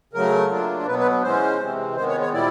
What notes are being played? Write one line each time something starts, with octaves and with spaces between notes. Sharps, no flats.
C#3 F#3 A3 A#4
F#3 A#3 D4 F4
B2 F#3 B3 B4
B4
E3 G#3 C#4 C5
C3 E3 G#3 C4
D#3 G#3 B3 C5
C#5
C#5
A#2 G3 C4 E4 D5